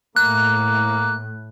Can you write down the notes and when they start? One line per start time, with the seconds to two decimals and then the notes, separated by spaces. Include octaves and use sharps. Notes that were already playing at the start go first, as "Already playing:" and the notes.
0.16 A2 A#3 F#6